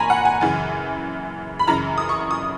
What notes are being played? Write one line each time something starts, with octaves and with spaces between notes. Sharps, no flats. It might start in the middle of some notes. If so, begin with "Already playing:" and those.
Already playing: A#2 G#5 A#5 B5 C#6
F#5
G#5
F#2 C#3 E3
B5
F#2 C#3 E3 A#5
D#6
C#6
D#6